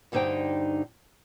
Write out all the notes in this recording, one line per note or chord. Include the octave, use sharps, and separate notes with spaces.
D2 G2 D3 D#4 C5 G5